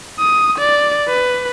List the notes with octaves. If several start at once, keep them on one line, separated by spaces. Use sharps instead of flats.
D#6
D5
B4